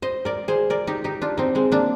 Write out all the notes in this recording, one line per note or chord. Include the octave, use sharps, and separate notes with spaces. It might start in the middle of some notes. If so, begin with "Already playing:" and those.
C5 D#5
A#4 D5
G#4 C5
A#4 D5
D#4 G4
D#4 G4
D4 F4
C4 D#4
G#3 C4
A#3 D4